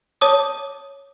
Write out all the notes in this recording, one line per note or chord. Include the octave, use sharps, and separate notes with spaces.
C#5 A5 D6 D#6